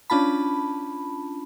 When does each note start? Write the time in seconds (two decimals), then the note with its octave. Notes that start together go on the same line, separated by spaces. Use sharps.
0.10 C#4 D4 F4 A5 B5